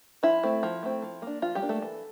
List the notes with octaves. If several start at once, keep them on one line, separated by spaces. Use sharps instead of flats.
F3 E4
A3 C4
F3
A3 C4
F3
A#3 D4
F3 F4
G3 G4
A#3 D4
A3 A4
E3